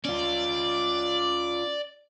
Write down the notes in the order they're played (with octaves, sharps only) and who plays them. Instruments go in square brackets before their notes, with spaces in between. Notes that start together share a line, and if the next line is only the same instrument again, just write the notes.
[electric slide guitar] C#4 F4 [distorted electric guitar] D5